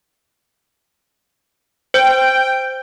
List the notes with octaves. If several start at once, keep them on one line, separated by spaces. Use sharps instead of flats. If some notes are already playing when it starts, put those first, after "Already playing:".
C5 G5